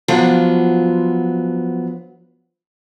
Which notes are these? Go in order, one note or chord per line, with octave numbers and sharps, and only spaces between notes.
F3 F#3 B3 D4 F4